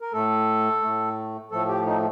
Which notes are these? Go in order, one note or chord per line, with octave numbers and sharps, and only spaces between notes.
A#4
A2 A3 A4
A2 A3
A2 F3 A3 A4
G4
D#4